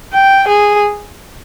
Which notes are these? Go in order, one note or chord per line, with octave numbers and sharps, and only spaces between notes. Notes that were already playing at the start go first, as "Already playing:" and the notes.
G5
G#4